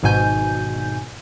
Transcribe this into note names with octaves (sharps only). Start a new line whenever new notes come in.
G#1 G#2 B2 G#5 G6